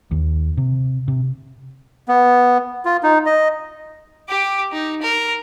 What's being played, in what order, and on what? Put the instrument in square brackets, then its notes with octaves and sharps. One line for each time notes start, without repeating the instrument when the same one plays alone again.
[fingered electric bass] D#2
C3
C3
[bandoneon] B3
F4
D#4
D#5
[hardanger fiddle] G4 D6
D#4
A#4